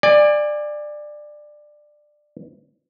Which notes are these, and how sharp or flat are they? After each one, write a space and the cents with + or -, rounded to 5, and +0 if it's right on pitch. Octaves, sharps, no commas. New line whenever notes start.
D5 +15 G#5 -25